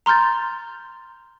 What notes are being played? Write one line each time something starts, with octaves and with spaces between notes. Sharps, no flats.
A#5 C6 F6 G6 A6